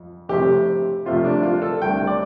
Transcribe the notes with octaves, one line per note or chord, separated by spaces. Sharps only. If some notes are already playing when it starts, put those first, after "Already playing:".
Already playing: F2
F2 C3 A3 C4 G4
F2 C3 A3 C4 F4
D4
F4
A4
C2 C3 A3 D4 G5
D5